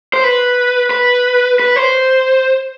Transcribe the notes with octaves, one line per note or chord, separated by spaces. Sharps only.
C5
B4
B4
B4
C5